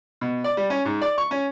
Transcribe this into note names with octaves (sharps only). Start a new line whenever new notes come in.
B2
D5
G3
C#4
G#2
D5
C#6
C#4